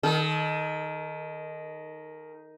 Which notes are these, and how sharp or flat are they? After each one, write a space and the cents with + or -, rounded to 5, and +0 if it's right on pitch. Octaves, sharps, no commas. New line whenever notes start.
D#3 +0 A4 -35